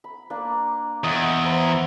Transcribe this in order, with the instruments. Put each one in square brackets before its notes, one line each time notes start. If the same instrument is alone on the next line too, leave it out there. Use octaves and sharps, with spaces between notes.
[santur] B5
A#3 D4 D5
[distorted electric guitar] E2 [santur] D#5 F#5
[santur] C5 A#5 B5